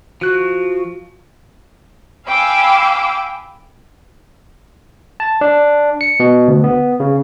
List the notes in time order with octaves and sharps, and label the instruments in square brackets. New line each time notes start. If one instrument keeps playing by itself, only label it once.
[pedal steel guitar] F3 F#6 [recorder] F#4
[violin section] F5 G5 G#5 B5 D6 E6
[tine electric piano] A5
D4
C#7
B2
D2
B3
C#3